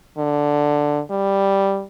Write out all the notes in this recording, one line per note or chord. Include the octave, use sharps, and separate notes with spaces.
D3
G3